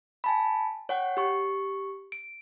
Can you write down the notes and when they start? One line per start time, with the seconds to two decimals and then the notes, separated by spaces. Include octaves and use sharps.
0.24 G#5 A5 B5
0.89 C#5 F#5 G5
1.17 G4 C#6
2.12 D7